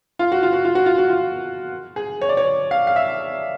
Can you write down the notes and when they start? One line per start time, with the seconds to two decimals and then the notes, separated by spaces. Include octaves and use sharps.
0.19 F4
0.32 F#4
0.43 F4
0.53 F#4
0.65 F4
0.75 F#4
0.86 F4
0.98 F#4
1.09 F4
1.96 G#4
2.21 C#5
2.29 D5
2.37 C#5
2.71 F5
2.87 F5
2.96 E5